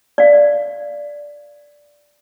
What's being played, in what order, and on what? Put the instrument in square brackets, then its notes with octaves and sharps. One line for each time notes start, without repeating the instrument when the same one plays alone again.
[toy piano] D5 F5